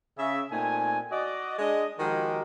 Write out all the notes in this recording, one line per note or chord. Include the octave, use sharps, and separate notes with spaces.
C#3 E5
A#2 A3 C4 D#4 G#5
F#4 D5 D#5
G#3 D4 D#5
D#3 F3 G#3 F#4 G4 A#4